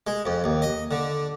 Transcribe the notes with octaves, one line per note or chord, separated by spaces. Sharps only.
G#3
F2
D#2
D#5
D3